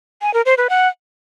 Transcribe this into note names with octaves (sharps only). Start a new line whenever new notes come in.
G#5
A#4
C5
B4
F#5